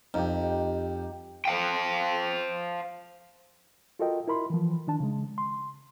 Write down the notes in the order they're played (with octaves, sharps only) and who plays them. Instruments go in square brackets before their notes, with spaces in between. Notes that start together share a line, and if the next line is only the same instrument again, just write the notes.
[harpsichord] F2 [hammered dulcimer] D#4 G4
[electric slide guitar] C5 F5 G5
[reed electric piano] F4 F#4 A4 A#4 D#5 G5
E4 A#4 B5 C6
E3 F3
D#3 D4 A5
C#3 G#3
C6